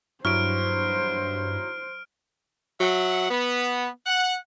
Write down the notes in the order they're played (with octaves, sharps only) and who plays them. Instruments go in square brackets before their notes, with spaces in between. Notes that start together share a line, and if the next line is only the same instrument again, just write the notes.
[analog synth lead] G2 [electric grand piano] F#3 E4 C#6 [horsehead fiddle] C5 [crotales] F6 D7
[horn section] F#3 E5 F#5
B3
F#5